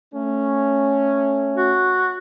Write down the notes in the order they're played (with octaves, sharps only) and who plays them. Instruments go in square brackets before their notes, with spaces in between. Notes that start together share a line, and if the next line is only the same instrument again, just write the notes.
[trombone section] A3 C#4
[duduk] F#4